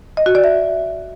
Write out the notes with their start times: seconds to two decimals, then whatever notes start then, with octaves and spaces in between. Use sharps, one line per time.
0.17 D#5
0.26 F#4
0.35 D5
0.44 E5